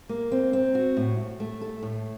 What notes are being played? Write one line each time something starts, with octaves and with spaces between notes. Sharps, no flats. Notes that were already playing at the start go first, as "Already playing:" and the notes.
A#3
C4
C4
F#4
A2
A2
A3
A4
A2